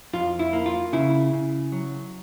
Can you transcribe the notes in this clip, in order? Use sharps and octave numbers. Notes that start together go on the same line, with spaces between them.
F2 F4
E4
A#3
F4
C#3 E4
C#3
F#3